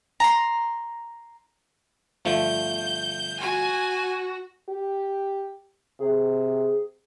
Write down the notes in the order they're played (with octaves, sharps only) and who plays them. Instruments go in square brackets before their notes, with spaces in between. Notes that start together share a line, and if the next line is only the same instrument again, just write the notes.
[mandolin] A#5 C6
[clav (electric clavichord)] G1 F3 A3 [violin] G6
[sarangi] F#4 [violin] G#5
[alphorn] G4
[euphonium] C3 [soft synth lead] G#4